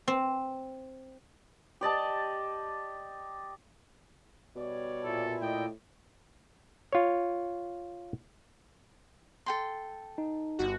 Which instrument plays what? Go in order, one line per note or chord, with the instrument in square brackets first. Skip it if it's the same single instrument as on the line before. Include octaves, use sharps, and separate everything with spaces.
[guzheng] C4
[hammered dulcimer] G4 D5 D#5 A5
[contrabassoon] B2 [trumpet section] G3 C#5 D5
[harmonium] A#2 E4 [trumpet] A4
[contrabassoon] A2 [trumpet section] D5 D#5 [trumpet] G5
[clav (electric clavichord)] F4 C#5
[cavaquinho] A4 G5 C6
[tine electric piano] D#4
[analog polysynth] G1 F#4